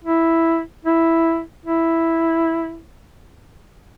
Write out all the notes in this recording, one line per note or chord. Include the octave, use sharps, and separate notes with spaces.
E4
E4
E4